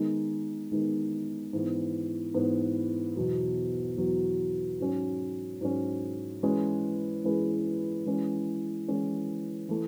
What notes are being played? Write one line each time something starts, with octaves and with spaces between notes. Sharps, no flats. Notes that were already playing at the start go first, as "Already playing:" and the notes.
Already playing: D#3 G#3 B3 D#4
D#3 G#3 B3 D#4
G#2 E3 B3
G#2 E3 B3
E2 B2 F#3
E2 B2 F#3
G#2 F#3 C#4
G#2 F#3 C#4
E3 G#3 C#4 G#4 B4
E3 G#3 C#4 G#4 B4
E3 G#3 C#4
E3 G#3 C#4
E3 A3